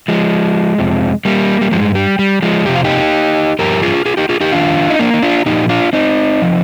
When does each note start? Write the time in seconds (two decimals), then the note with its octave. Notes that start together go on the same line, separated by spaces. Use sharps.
0.08 F3 G#3
0.78 F2 C3 F3
1.25 G3 A#3
1.61 G3
1.71 G2 F3 G#3
1.95 G3
2.19 G3
2.42 F3 G#3
2.65 F2 C3 F3 G4
2.75 F4
2.84 D#4 G4
3.59 G2 F3 G4 A#4
3.82 F4 G#4
4.06 F4 G#4
4.17 D#4 G4
4.29 F4 G#4
4.41 D#4 G4
4.52 F2 D#3 D4 F4
4.90 D#4
4.99 A#3 D4
5.14 D#4
5.22 D4 F4
5.46 A#2 F3 D#4 G4
5.69 D4 F4
5.93 C4 D#4
6.42 F3